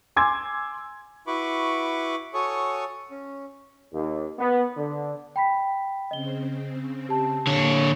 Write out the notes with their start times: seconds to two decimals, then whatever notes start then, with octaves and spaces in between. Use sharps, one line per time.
0.16 G#5 C6 D6 E6 G#6
1.27 E4 F#4 B4 B5 C#6 D6
2.34 F#4 A4 C#5 G#5 C#6 D#6
3.11 C#4
3.94 D#2
4.39 B3
4.77 D3
5.36 G5 B5 B6
6.11 C#3 C4 D#5 G7
7.09 G4 A5
7.47 D3 A#3 C#5